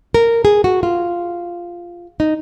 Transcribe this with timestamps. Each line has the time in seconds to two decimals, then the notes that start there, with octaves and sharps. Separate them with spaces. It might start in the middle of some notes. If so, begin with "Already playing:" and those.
0.14 A#4
0.45 G#4
0.64 F#4
0.83 F4
2.20 D#4